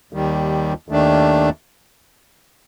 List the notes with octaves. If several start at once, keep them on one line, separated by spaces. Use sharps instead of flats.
D#2 D#3 G3
D#2 D#3 A3 D4